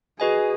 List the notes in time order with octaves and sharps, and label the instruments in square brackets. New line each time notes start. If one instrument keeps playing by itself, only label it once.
[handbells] F#4 B4 D#5 G#5 [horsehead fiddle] G#4